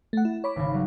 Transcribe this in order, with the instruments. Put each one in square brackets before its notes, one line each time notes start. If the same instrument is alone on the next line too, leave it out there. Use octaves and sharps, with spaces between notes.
[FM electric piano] A3 F#5
E4
C#5 B5 D6
[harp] G#1 C#3
F#3 G3